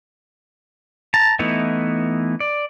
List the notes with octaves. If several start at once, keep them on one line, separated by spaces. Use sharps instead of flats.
A5 A#5
E3 A3 B3 D#4 E4
D5